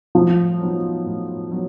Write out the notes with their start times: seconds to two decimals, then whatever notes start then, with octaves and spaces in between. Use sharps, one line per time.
0.15 A2 F3
0.61 F#3 B3 D#4
1.06 A2
1.51 F#3 B3 D#4